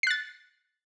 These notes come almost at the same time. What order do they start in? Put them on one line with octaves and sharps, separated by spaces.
C7 F#6 A6